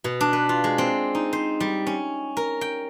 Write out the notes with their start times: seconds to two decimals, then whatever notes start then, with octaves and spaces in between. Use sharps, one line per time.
0.04 B2
0.21 D4
0.33 B4
0.49 F4
0.64 G#3
0.78 C4
1.15 D#4
1.33 C5
1.60 G3
1.87 C#4
2.37 A#4
2.61 G5